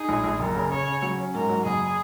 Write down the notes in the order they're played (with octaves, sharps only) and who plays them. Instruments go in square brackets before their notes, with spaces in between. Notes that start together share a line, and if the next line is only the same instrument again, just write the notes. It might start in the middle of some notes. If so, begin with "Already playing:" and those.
Already playing: [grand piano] D#4 [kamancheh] G#4
[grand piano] A#1
A#1
[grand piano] F#1 [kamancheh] A#4
[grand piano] C#3
[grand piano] C#3 [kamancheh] C#5
[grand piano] C#3
F#3
C#4
[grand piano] G#2 [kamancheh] A#4
[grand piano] F#3
[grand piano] F#1 [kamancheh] G#4